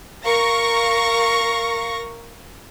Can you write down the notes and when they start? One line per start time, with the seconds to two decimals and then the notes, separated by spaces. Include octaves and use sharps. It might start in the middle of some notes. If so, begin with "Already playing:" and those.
0.24 A#4 F5 C#6 A#6